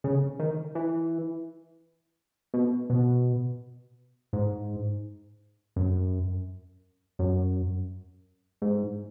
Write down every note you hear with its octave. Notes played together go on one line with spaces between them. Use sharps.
C#3
D#3
E3
B2
B2
G#2
F#2
F#2
G#2